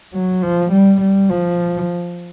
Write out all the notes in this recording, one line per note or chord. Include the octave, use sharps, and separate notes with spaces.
F#3
F3
G3
G3
F3